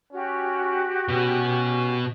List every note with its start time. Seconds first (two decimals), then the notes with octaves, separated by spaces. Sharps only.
0.13 C#4 F#4 G4
1.08 B2 B3 C#4